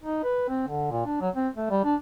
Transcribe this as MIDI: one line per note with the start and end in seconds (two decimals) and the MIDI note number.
0.03 0.24 63
0.24 0.46 71
0.49 0.66 60
0.68 0.89 50
0.91 1.02 46
1.06 1.19 62
1.21 1.30 54
1.35 1.49 60
1.57 1.69 57
1.71 1.80 55
1.85 1.96 62